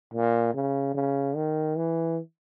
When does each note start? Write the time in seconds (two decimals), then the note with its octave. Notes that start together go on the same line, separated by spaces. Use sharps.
0.14 A#2
0.55 C#3
0.94 C#3
1.36 D#3
1.76 E3